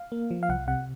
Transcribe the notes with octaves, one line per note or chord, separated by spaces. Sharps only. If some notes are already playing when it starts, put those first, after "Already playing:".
Already playing: F5
A#3
F3
F5
C2 F#5
C3 F#5